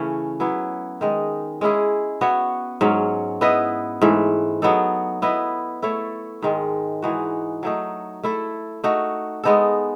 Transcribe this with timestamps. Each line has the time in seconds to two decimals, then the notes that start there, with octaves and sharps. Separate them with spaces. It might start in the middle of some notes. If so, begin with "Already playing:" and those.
Already playing: C#3 E3 A3 C#4
0.40 F#3 B3 E4 B4
1.01 D#3 G#3 D#4
1.61 G#3 C#4 E4 G#4
2.21 B3 F#4 C#5 E5
2.81 G#2 F#3 C#4
3.41 B3 E4 B4 D#5
4.02 G#2 E3 A3
4.62 F#3 B3 D#4 A4
5.22 B3 E4 B4 D#5
5.82 A3 E4 A4 C#5
6.42 G#2 D#3 G#3
7.02 E3 G#3 D#4 F#4
7.63 F#3 A3 D#4
8.23 A3 E4 A4
8.84 A3 D#4 F#4
9.44 G#3 B3 D#4 A4